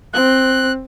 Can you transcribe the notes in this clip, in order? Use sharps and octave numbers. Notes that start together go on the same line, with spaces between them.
C4 F#6